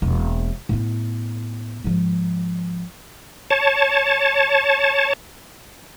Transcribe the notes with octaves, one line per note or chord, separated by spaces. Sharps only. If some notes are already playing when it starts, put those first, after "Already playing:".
E1 A#3
A2 B3
G#2 F3
C#5 A5